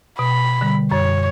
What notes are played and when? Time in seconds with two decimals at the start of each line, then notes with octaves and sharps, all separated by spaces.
0.19 B2 B5
0.61 D3 G3
0.91 F#2 C#5